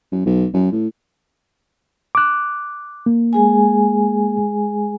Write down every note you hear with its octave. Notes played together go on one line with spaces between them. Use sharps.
F#2
B1
F#2
A2
D6 F#6
A#3
G#3 G#4 G#5